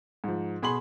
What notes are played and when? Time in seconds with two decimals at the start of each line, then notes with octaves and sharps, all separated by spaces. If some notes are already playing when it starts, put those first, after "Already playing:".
0.24 G#2 F3
0.63 B2 G#4 B5 C6 F#7